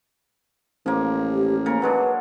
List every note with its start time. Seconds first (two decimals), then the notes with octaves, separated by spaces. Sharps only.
0.86 A1 F3 A#3
1.31 G4
1.66 C#3 A#3 A#4
1.82 F#3 G#3 D4 B4